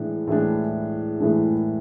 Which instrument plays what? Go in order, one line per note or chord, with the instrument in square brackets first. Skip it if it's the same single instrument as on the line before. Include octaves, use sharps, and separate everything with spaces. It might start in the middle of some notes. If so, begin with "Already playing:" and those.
Already playing: [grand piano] A2 E3 G#3 D4
A2 E3 G#3 D4
A2 E3 G#3 D4